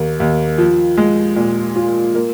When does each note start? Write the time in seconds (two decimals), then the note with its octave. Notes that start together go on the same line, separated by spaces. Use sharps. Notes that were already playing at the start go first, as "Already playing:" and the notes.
Already playing: D#2 A#3
0.20 D#2
0.58 F3
0.97 G#3
1.36 A#2
1.76 F4
2.15 A#3